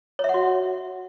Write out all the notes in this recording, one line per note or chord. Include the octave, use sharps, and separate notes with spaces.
C#5
E5
F#5
F#4